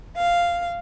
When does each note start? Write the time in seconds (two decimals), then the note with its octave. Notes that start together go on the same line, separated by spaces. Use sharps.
0.16 F5